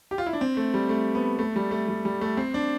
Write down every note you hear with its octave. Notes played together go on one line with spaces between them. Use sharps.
G4
F4
E4
D4
C4
A3
G3
A3
B3
A3
G3
A3
G3
G3
A3
C4
D4